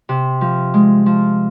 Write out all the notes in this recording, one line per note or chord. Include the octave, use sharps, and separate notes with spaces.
C3
F3
G#3
F3